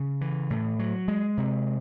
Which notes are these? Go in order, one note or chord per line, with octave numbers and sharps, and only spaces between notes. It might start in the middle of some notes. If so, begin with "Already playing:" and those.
Already playing: C#3
E3
A2
F#3
G#3
C3